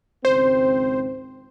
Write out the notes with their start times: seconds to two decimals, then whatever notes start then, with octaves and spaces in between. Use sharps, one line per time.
0.25 G#1 C#2 C4 C5